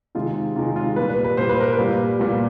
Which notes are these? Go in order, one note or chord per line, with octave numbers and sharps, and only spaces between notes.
C3 D#3 G#3 F4
C3 D#3 G#3 F4
F4
A#2 G3 B4
B4
B4
A#2 G3 C5
B4
A#4
B4
A#2 G3
A#2 G3